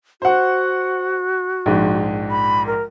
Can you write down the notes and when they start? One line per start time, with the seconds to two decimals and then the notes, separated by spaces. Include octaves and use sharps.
0.22 F#4 C5 F#5
1.66 A#1 G#2
2.30 B5
2.67 A#4